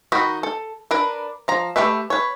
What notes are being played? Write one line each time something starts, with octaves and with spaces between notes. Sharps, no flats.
D#3 D#4 F#4 B5
A4
D4 A#4 B4
F3 A#5
A3 G4 B4 E5
B4 C#5